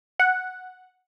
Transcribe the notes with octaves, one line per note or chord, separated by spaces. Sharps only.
F#5